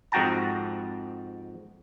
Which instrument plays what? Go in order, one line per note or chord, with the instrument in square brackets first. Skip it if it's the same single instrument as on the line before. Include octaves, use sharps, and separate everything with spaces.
[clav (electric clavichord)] F2 G#2 F#4 G5 A5 A#5